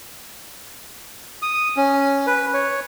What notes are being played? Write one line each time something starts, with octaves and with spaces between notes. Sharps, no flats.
D#6
C#4
B4
C#5